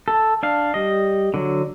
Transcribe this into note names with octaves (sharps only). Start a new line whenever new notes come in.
A4
D4 F5
G3 D#5
D3 F#3